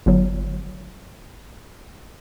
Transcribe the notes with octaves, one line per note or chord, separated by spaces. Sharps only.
G1 F#3